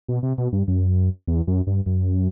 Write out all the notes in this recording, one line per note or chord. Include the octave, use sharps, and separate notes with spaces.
B2
C3
B2
G2
F#2
E2
F#2
G2
F#2